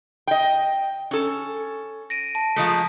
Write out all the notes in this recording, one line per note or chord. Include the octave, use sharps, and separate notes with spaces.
D#5 G5
C#4 A4
A#6 D7 D#7
A5
F3 G#3 A3 A#5 D#6 B6